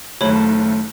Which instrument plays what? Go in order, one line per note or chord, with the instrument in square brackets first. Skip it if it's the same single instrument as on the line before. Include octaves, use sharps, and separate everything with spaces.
[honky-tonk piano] F#1 D#2 [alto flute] A3 [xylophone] C#5 B5